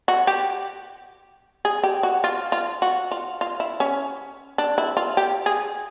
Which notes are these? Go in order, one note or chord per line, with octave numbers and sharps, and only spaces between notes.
F#4
G4
G#4
G4
F#4
F4
F4
F#4
F4
F4
E4
C#4
D4
E4
F4
G4
G#4